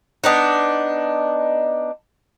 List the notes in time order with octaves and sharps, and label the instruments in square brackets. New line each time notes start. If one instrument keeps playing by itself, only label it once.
[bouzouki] B3 D4 D#4